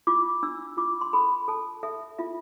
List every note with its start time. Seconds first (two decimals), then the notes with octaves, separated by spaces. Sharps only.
0.07 F4 D6
0.43 D4 E6
0.77 F4 D6
1.01 C6
1.13 A4 B5
1.48 A4 A5
1.83 A4 E5
2.18 F4 E5